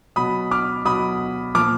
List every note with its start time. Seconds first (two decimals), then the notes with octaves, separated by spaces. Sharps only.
0.16 B2 F#3 B5 D#6
0.51 D6 F6
0.85 B2 F#3 B5 D#6
1.55 A#2 F3 D6 F6